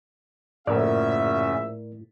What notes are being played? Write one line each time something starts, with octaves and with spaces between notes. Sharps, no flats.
A#1 F#2 A2 C#3 C#4 A#4 D5 E5